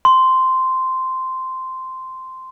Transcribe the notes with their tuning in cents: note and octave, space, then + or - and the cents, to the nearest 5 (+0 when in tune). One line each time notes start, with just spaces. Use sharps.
C6 -10